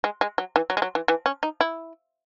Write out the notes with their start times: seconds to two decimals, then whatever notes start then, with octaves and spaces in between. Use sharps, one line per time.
0.04 G#3
0.21 G#3
0.38 F#3
0.56 E3
0.70 F#3
0.77 G#3
0.82 F#3
0.95 E3
1.08 E3
1.26 C#4
1.43 D#4
1.61 E4